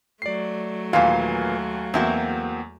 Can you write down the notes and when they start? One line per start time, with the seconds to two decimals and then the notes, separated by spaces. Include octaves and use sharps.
0.22 F#3 A3 D5 C7
0.93 D#2 A#2 E3 F5 G#5
1.94 E2 A#3 C4 E4 F#4